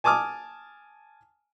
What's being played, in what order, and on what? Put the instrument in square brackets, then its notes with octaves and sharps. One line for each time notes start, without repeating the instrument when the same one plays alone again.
[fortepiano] G#5 A5 D6 D#6 F6